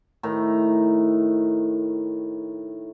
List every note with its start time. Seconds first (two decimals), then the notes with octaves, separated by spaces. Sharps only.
0.23 A2 D#3 A#5